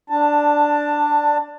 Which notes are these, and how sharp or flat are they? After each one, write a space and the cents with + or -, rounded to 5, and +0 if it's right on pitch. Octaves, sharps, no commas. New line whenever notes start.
D4 +0 A5 +15